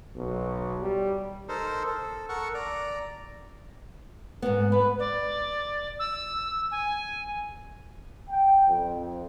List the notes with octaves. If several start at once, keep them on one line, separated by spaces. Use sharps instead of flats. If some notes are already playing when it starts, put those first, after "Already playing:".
B1
G3
D#4 A4 A#4 C5
A4
A4 A#4 F#5 C#6
D5 A#5
G#2 B3
B3 B4
D5
E6
G#5
G5
F2